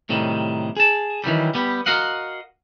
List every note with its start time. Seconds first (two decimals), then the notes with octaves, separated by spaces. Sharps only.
0.09 A2 C3 D#3 F#3 G3
0.77 G#4 A5
1.24 D#3 E3 F#3 G3
1.54 G3 B3 G4
1.86 F#4 A#4 D#5 F5 F#5